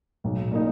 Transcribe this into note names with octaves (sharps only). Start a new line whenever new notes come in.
B1
A#2 A#3 D#4